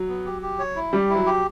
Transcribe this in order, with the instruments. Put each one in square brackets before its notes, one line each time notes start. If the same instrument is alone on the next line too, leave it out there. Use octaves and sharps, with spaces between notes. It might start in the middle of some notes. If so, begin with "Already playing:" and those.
Already playing: [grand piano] F#3
[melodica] B3
G4
G4
C#5
E4
[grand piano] G3 [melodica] G4
[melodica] E4
[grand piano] F#3
[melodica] G4